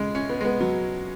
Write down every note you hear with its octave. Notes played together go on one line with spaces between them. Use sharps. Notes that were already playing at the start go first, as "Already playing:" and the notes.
Already playing: C#3 G#3
C#4
B3
G#3
B3
F#3